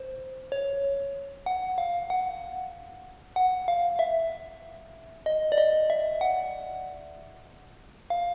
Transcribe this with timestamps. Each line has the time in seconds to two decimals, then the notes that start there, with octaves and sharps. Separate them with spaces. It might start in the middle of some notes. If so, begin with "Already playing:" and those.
Already playing: C5
0.52 C#5
1.46 F#5
1.78 F5
2.10 F#5
3.36 F#5
3.68 F5
3.99 E5
5.26 D#5
5.52 D5
5.58 D#5
5.90 E5
6.21 F#5
8.10 F5